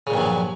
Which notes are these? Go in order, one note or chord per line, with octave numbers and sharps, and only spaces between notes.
G2 A#2 C#3 F3 F#3